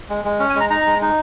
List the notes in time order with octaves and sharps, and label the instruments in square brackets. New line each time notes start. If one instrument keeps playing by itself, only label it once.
[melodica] G#3
G#3
C#4
G#5
G#3 A#5
D#4 A#5
G#3
D#4